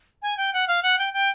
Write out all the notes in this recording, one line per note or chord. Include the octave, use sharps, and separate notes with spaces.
G#5
G5
F#5
F5
F#5
G5
G5